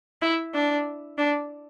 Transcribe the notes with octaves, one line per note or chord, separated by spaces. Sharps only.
E4
D4
D4